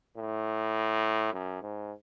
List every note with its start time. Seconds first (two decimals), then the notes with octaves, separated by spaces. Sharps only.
0.17 A2
1.33 F#2
1.62 G#2